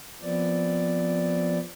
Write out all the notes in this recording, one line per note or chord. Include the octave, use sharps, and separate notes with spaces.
F3 B3 C4 D5